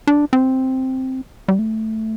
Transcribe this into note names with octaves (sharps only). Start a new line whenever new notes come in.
D4
C4
G3
A3